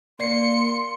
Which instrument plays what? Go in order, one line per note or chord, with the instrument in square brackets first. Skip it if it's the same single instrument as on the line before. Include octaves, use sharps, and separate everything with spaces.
[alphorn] A#3 [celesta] D5 C7 [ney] C6 [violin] C#7